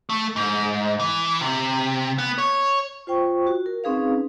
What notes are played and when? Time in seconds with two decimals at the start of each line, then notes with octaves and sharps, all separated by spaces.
0.09 A3
0.36 G#2
0.99 E3
1.41 C3
2.18 B3
2.38 C#5
3.07 F4 C5 G5 C#6
3.47 F#4
3.66 A#4
3.84 C4 C#4 D#4 G#4 B4 F5